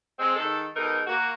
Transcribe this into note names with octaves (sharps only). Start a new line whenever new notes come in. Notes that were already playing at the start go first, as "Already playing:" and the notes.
G#3 C4
D#3 G#3 A4
B2 G#3 D#4 A4 A#4
A#3 F#4